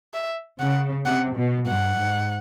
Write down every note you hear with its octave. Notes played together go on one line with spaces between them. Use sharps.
E5
C#3 F#5
C3 F#5
B2
G2 F#5
G#2